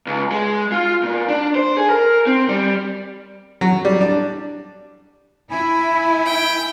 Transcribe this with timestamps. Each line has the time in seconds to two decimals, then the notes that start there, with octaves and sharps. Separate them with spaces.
0.07 C#2
0.31 G#3
0.72 F4
1.03 A#2
1.29 D4
1.55 C5
1.77 G#4
1.90 A#4
2.27 C4
2.49 G3
3.61 F#3
3.85 G3
4.01 D4
5.51 E4 G#5 B5
6.25 G5